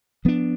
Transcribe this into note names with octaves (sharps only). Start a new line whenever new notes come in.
F3 B3 D4